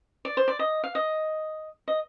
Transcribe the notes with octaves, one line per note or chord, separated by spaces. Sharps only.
D5
C5
D5
D#5
F5
D#5
D#5